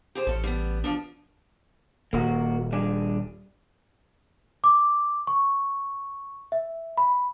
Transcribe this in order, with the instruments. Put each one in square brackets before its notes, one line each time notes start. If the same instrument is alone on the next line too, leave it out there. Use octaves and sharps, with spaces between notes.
[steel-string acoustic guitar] G4 G#4 C5
[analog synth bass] A1 [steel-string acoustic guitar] C#4 A4
[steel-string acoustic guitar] G3 B3
F3 D4
[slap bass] D#1 [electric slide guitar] A#3 F#4
[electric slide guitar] G3 D4 G#4
[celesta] D6
C#6
E5
B5